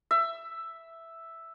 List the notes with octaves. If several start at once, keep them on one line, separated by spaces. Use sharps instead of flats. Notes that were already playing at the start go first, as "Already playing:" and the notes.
E5